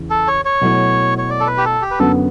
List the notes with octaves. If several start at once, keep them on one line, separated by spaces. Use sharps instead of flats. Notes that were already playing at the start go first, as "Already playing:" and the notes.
Already playing: E2 C#3 E3
A4
C#5
C#5
B2 F#3 A3 E4
C#5
D5
A4
B4
G4
A4
G4
B4
F#2 D3 F#3 B3 A4